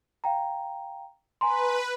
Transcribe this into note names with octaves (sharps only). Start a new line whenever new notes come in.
F5 G5 A#5
B4 G#5 A#5 C6